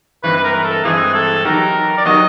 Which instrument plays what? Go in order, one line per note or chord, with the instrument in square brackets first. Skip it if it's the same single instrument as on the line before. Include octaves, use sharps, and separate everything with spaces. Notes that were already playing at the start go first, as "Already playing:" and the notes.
[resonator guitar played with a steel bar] G2 E3 G#3 C4 [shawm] B4
[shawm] B4
A#4
A4
[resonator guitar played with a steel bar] G2 E3 G#3 C4 [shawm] G#4
[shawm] A4
[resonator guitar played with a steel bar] F#3 B3 D#4 G4 [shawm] A#4
[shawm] D5
[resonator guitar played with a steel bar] F#3 B3 D#4 G4 [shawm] D#5